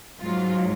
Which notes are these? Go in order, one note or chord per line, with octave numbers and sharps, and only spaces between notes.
G#2 F#3 F4